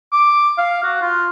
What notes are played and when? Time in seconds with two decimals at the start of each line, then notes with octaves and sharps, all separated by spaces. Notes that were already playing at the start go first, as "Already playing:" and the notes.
0.12 D6
0.58 F5
0.83 F#4
1.02 F4